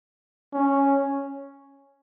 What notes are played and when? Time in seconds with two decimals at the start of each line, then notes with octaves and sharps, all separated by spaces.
0.53 C#4